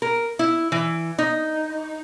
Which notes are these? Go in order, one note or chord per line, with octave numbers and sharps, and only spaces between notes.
A#4
E4
E3
D#4